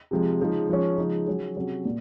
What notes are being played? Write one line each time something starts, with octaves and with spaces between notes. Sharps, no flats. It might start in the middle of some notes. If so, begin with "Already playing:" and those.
C3 F3 G#3
C#3 F3 G#3 D#4
F3 G#3 C#4
C#3 F3 G#3 D#4
F#3 C#4 G#4
C3 F#3 C#4 G#4
A#2